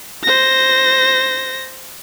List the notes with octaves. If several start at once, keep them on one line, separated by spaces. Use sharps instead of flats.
C5 A#6